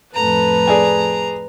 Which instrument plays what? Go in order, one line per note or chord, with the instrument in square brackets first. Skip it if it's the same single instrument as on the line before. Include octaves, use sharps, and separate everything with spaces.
[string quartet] F2 A2 A4 [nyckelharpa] B4 [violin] A#5
[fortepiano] G#4 D5 G#5